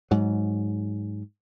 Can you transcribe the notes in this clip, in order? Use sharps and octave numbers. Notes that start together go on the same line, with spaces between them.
G#2 F#3